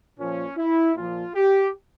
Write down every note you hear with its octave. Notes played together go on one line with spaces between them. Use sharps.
A#2 F3 C#4
E4
A#2 F3 F4
G4